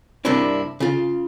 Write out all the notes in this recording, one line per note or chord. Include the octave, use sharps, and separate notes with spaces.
G2 C3 A#3 D4 E4
C#3 F4